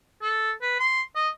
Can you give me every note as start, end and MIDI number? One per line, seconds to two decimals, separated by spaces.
0.22 0.52 69
0.62 0.77 71
0.80 1.02 84
1.16 1.29 75